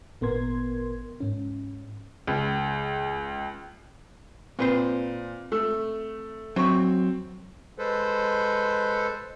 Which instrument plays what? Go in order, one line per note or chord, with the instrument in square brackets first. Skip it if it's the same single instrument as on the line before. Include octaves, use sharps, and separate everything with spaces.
[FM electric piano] G#1 A#2 B3 A#4 C6 G#6
G#2 C#4
[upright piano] C#2
[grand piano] A#2 [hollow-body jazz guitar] C4 B4 C5
[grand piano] A3 E6
[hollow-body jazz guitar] F#3 [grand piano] C4 C#6
[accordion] G#3 A4 B4 C5